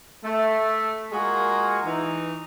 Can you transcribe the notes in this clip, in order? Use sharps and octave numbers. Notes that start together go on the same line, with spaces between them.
A3
G#3 A#3 F4 F#4 G#4 A#4
E3 D#4